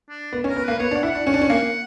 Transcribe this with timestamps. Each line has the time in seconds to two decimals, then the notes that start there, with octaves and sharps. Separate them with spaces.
0.09 D4
0.32 B3
0.44 C#4
0.49 A#4
0.56 B3
0.64 A#3 B4
0.79 B3 C#5
0.91 D4
0.96 F#5
1.03 E4
1.10 D4 F#5
1.26 C#4 F#5
1.34 D4
1.42 C#4
1.50 A#3